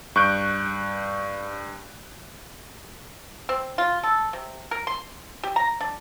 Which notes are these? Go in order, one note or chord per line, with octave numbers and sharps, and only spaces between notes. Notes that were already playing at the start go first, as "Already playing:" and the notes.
G2 C#6 F#6 G6 D7
C4
F4
A4
C3
A#4
C6
G4
A#5
D4